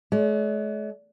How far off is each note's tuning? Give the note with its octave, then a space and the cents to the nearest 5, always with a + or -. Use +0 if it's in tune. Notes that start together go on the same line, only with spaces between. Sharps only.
G#3 +45 D5 -45